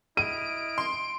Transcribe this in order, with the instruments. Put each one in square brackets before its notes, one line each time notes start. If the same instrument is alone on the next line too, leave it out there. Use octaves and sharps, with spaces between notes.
[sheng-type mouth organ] E4 D#5 F6 [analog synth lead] D7 [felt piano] D#7
[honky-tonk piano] C6